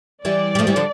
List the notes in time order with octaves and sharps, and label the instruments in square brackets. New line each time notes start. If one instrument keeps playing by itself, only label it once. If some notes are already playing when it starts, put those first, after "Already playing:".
[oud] E3 G3 [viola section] D5
[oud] G3
F3 A3
E3 G3
D3 F3